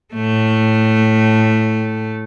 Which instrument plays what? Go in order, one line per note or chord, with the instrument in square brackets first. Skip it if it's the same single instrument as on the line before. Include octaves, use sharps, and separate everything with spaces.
[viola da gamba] A2 A3